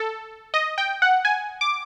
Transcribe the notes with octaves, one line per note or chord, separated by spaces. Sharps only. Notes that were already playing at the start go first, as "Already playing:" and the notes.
Already playing: A4
D#5
G5
F#5
G#5
D6